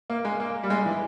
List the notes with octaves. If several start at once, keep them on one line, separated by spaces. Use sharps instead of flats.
A#3
G#3
A#3
G3
G#3
E3